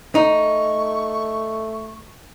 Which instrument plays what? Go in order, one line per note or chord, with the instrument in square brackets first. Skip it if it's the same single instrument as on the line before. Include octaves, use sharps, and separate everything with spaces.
[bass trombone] A3 [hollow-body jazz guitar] D#4 [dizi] C#6